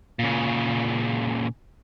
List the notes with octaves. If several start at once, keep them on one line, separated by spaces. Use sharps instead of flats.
A#2 C#3